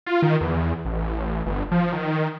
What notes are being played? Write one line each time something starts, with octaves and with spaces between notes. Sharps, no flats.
F4
D#3
E2
A1
G1
F3
D#3